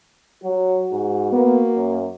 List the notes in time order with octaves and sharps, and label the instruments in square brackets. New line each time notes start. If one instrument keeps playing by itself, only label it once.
[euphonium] F#3 [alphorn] F#4
[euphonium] G#2
[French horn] A#3 [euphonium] B3
[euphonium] F#2